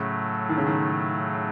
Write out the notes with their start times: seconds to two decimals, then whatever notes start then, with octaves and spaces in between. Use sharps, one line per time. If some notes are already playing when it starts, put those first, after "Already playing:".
Already playing: A2 C#3 F#3 A3
0.49 D#3
0.58 C#3
0.67 D#3